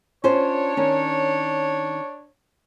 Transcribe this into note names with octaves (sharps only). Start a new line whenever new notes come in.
C#4 D4 F4 C5 C#5
D#3 C#4